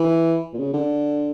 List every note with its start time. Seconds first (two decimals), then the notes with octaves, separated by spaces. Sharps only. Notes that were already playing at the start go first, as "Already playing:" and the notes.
Already playing: E3
0.54 A#2
0.59 C#3
0.74 D3